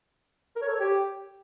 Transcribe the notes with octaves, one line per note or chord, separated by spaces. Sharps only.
A#4
C#5
A4
C#5
G4